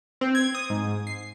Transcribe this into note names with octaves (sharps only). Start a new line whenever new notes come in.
C4
G#6
D#6
G#2
C7